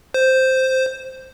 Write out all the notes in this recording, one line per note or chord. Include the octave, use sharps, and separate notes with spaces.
C5